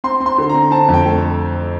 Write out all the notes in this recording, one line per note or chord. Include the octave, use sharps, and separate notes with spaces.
C4 C6
C4
C6
D3
C4 A#5
C4 A5
F2
G5
A3